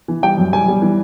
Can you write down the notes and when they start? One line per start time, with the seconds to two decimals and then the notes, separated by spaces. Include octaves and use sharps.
0.08 E3
0.23 G3 G5
0.38 F#2
0.53 G3 G#5
0.68 G3
0.82 E3